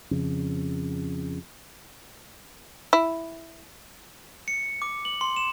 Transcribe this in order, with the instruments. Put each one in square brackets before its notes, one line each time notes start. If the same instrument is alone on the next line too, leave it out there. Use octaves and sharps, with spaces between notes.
[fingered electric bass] F2 C#3
[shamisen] E4
[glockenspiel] C#7
D6
F#7
C6
E7